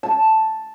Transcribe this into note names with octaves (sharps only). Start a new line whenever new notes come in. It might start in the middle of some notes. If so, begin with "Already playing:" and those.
A5